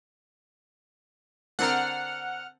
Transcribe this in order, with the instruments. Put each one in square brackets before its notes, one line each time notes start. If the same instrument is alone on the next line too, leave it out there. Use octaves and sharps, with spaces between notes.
[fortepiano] D3 C4 A#4 [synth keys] F#5 F6